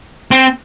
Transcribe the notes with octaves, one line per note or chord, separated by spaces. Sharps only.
C4